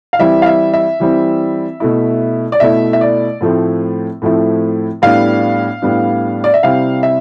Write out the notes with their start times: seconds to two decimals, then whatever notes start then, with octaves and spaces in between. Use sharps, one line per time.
0.13 F5
0.19 E3 G3 C4 E4 E5
0.42 F5
0.46 E5
0.74 E5
1.00 E3 G3 C4 E4
1.80 B2 A3 E4
2.52 D5
2.60 B2 A3 E4 E5
2.93 E5
3.01 D5
3.41 A2 F3 A3 C4 E4
4.22 A2 F3 A3 C4 E4
5.02 A2 G3 B3 D4 F5
5.82 A2 G3 B3 D4
6.44 D5
6.54 E5
6.63 C3 G3 C4 E4 F5
7.03 E5